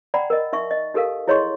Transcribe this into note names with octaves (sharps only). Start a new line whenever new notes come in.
D5 F#5 G5 A#5 B5
A#4 D#5
D#4 E5 C#6
D#5
D#4 G4 A4 A#4 F5
E4 G#4 C#5 D#5 C6 C#6